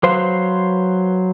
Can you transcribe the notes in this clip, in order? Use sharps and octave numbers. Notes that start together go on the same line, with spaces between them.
F#3 B4 C5 F5